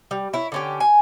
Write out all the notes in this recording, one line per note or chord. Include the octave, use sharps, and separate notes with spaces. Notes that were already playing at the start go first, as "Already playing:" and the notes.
G3
E4 C#5
D3 C#4 G4
G#5